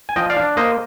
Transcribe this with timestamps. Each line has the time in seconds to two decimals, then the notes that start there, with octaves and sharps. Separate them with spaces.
0.09 G#5
0.16 F3 D#5 G5
0.30 D5 F5
0.36 D4
0.57 A#3 C5 D#5